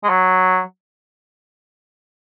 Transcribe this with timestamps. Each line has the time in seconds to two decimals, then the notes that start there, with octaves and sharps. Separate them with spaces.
0.04 G#3
0.09 F#3